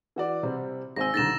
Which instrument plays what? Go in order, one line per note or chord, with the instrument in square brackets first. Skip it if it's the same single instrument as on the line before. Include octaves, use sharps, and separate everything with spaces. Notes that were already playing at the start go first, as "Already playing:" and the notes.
[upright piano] E3 F#4 D5
C3 G3 C4
[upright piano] G#1 C4 G#5 [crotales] E6 A#6
[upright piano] C2 D3 D#3 [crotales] A6 A#6 E7